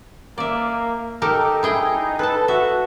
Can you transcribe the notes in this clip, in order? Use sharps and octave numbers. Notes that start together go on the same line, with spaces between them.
A#3 D5 E5
D#4 G4 A4 A#4
E4 G#4 G5
A4 B4 A5
F#4 E5